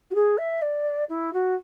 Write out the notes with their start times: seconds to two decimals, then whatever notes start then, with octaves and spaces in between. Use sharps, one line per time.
0.10 F#4
0.15 G#4
0.37 E5
0.62 D5
1.09 E4
1.33 F#4